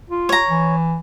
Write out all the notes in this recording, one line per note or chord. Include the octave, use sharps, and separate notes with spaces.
F4
C#5 A#5
E3